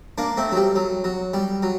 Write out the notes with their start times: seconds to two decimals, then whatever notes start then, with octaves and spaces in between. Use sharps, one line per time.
0.18 A#3 D4
0.37 A3 C4
0.52 F#3
0.56 G3
0.76 F#3
1.04 F#3
1.34 G3
1.63 F#3